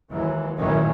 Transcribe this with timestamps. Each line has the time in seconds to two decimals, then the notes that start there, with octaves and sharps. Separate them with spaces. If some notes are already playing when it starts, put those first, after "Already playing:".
0.10 D#2 E3 F#3 G#3
0.57 A1 F#2 A#2 D#3 E3 C#4